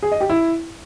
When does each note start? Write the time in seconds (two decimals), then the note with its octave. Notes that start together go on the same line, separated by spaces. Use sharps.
0.03 G#4
0.12 D#5
0.21 G4
0.30 E4